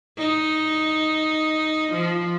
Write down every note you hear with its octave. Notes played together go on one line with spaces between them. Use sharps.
D#4
F3